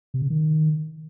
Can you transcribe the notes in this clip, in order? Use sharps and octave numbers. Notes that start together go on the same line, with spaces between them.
C3
C#3
D#3